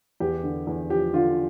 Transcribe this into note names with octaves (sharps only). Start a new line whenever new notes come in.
E2 G4
D3
E2
F3 G4
D3 F4